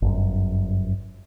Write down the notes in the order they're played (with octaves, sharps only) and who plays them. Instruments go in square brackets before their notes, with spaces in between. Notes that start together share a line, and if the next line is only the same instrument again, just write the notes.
[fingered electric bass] G1 F#2